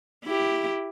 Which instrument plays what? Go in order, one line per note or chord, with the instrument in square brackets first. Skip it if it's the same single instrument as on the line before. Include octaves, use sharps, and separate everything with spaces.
[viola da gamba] E4 G4